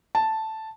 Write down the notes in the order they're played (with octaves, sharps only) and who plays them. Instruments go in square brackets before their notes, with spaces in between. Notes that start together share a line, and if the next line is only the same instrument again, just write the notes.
[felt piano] A5